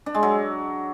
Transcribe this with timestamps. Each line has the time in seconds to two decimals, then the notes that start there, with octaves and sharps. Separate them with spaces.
0.06 D4
0.15 G#3
0.23 F#3